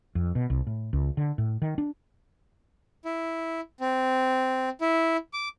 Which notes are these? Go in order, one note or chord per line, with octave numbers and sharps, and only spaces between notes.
F2
B2
C2
A2
C#2
D3
A2
D#3
D4
E4
C4
E4
D6